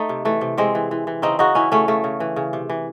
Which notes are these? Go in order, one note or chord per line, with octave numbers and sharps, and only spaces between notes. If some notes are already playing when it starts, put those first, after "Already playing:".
Already playing: A3 D#4
C3
E3 A3
C3
C3 G#3 C4
E3
E3
E3
C#3 C4 D#4
C#3 D#4 F#4
E3 C#4 E4
C#3 A3 C#4
C#3 A3
C#3
E3
C#3
C3
E3